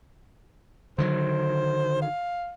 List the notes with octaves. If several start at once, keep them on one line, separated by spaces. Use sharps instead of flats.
D3 D#3 F#3 C5
F5